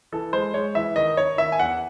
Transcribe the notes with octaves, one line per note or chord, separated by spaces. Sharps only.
E3 A4
G#3 C5
G#3 C#5
E3 E5
D#3 D#5
D#3 C#5
D#3 E5
G#5
E2 F#5